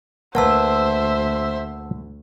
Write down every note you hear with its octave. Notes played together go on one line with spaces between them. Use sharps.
D2 A#3 B4 C5 E5 F#5 A5 E6